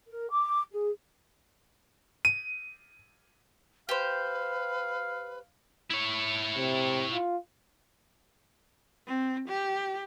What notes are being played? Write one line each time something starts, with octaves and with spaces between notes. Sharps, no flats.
A#4
D6
G#4
D#7
G4 B4 C5 F5
E4 C#5
C3
F4
C4
G4